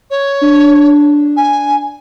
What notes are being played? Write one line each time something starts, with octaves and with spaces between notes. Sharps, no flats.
C#5
D4
G#5